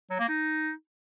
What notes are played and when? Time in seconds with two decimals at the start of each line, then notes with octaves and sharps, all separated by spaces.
0.10 F#3
0.19 A#3
0.28 D#4